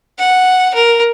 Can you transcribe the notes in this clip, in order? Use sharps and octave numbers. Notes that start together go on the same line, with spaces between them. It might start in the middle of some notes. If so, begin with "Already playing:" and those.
F#5
A#4